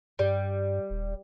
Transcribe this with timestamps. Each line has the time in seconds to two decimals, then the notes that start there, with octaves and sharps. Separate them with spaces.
0.19 G2 G3
0.90 D#1